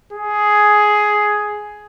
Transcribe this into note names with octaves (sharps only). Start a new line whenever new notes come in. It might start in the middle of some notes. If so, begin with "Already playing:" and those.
G#4